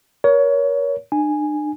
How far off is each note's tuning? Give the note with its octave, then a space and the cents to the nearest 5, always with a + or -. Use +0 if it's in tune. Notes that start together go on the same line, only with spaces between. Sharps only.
A#4 +30 C#5 +25
D4 +40 G#5 +0